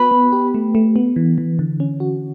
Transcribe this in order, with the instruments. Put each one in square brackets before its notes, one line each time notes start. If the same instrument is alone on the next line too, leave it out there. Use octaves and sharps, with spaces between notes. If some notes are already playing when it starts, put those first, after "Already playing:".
Already playing: [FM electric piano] B3 F#4 [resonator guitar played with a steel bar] B4
[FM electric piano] B3
G4
A3
A3
B3
E3
E3
D3
C#4
F#4